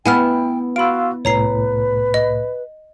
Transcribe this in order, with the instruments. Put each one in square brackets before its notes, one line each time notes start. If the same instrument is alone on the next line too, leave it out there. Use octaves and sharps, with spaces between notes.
[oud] B3 E4 [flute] G5 [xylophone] G#5 F6
[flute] F#4 [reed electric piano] F5 C6 E6 [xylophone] B5 D7
[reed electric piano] C2 A2 [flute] B4 [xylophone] C#5 A#5 C7
[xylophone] D#5